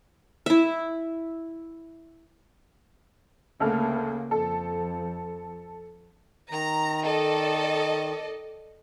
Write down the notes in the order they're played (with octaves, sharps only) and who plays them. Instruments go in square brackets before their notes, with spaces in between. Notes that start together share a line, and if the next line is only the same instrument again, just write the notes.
[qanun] E4 E5
[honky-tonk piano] D2 A4 F6 [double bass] C#3 A#3
[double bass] F2 [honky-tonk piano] A4
[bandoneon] D#3 [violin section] A#5
[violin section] A4 D5 D#5